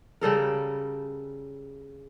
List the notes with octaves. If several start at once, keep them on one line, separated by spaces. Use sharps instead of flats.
C#3 G3 A4 A#4